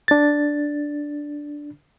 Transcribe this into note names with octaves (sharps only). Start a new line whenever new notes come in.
D4 A6